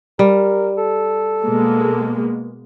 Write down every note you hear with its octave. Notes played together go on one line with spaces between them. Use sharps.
G3 A#4
A4
B2 G#3 A#3